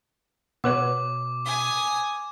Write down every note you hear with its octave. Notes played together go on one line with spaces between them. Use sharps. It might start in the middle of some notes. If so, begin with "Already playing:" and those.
B2 B3 B4 C#5 D6
G#5 D#6